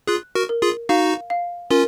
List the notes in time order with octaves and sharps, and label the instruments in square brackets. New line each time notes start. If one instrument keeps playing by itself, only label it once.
[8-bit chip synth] F4 G#4 [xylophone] F#6
[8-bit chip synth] F#4 A#4
[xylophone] A#4
[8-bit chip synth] F4 G#4
[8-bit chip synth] D#4 F#4 [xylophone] F5
[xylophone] F5
[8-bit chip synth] C#4 F4 [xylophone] A#4